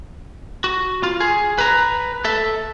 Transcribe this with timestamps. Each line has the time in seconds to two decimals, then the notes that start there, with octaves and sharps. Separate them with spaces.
0.64 F#4
1.03 F4
1.20 G#4
1.58 B4 A#5
2.25 A4 E5